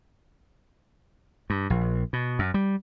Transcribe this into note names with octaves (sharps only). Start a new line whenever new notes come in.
G2
A#1
B2
F#2
G3